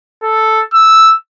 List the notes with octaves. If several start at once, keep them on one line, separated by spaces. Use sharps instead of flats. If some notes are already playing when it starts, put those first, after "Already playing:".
A4
E6